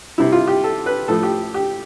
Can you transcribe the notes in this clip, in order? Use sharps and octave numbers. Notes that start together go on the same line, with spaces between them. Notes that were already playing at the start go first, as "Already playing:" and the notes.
C3 G3 E4
F4
G4
A4
B4
A2 F3 A4
G4
G4